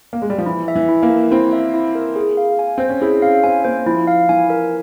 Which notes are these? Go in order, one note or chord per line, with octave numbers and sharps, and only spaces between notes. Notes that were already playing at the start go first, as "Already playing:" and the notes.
A#3
G#3
G3
F3
E3 E4
E5
E3
E4
A#3
A#4
C4 E4
E5
E4
A#4
G#4
F5
G#5
C4 C5
C#4
E4 G#4
C#4 F5
C4 G#5
A#3 C5
F3 E4
F5
E3 G#5
A#4